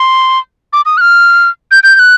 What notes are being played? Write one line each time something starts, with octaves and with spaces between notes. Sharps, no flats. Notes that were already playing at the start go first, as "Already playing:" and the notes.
Already playing: C6
D6
D#6
F#6
F6
G6
G6
G6
F#6